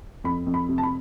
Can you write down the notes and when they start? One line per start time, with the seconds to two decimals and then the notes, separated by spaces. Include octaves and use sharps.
0.24 F2 B5
0.46 F2
0.54 B5
0.69 C3
0.78 A5
0.83 B5